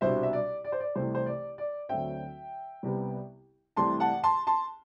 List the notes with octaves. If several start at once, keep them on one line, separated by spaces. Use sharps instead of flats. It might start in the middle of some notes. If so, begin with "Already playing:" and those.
C2 B2 G3 D4 C5 E5
E5
D5
D5
C5
D5
C2 C3 E3 A3 C5
C5
D5
D5
D2 D3 F#3 C4 E5 G5
C2 C3 G3 B3
C2 C3 E3 A3 A5 C6
F#5 A5
A5 C6
A5 C6